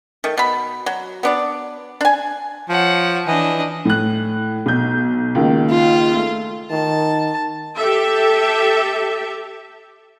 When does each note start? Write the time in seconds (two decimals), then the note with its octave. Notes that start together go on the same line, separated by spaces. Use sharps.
0.24 D#3 A3
0.37 B2 B5
0.86 F#3
1.23 B3 D4 D5
2.01 D4 G#5
2.69 F3 C#5 F#5
3.27 E3 D4 D#5
3.85 A2 F#6
4.66 B1 G6
5.35 C#2 D#3 A#3
5.70 F4
6.15 A3
6.71 D#3 A5
7.77 G4 A4 E5